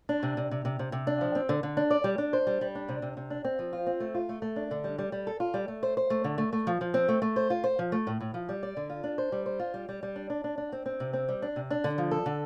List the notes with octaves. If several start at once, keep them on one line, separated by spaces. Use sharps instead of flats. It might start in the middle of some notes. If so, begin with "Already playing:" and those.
D4
C3
C3
C3
C3
C3
C3
D4
F3
C4
D3
D3
D4
D5
G3
D4
C5
G3
G3
D4
C3
C3
C3
D4
C4
F3
F4
C4
A3
F4
A3
A3
D4
D3
G3
G3
G3
A4
F4
G3
A3
C5
C5
A3
D3
A3
A3
F3
F3
C4
A3
A3
C5
F4
C5
F3
A3
A2
A2
F3
G3
D5
D3
F4
D4
C5
G3
C5
F4
G3
G3
G3
D4
D4
D4
D4
C4
C4
C3
C4
G3
D4
C3
D4
D3
F3
A4
D3